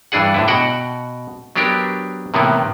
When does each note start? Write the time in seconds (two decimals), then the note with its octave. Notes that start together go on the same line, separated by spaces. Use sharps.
0.12 G2 E3 D4 G#4 F#5
0.34 A2 D3 E4
0.48 B2 F#4 F#5 G5
1.56 F#3 B3 D4 G4 A#4
2.34 A2 C3 D#3 E3 A#3 B3